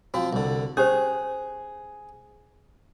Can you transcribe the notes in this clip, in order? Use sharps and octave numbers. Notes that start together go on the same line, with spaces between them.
F3 C4 F#4
C2 D3
C#4 G4 G#4 C5